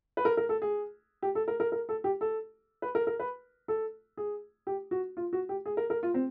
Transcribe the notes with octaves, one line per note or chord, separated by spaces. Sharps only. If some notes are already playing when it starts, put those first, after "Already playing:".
B4
A#4
A#4
A4
G#4
G4
A4
A#4
A#4
A#4
A4
G4
A4
B4
A#4
A#4
B4
A4
G#4
G4
F#4
F4
F#4
G4
G#4
A#4
A#4
F4
C4